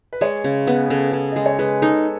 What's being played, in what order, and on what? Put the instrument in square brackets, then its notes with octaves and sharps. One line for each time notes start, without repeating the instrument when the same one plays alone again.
[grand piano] B4
[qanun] G#3 [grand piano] C#5
[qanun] C#3
[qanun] B3 [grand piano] B4
[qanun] C#3 [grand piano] A4
[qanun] C#3
[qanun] G#3 [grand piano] D#5
[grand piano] C#5
[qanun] G#3 [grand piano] B4
[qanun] D#4 [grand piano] A4